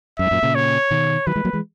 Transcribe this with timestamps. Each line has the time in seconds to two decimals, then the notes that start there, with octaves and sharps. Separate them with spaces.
0.19 F#2 E5
0.26 G#2
0.31 F#2 A#2
0.43 A#2 C#3
0.55 C#5
0.91 B2 D#3
1.27 D#3 F#3 B4
1.36 E3 G#3
1.45 F#3 A#3
1.53 E3 G#3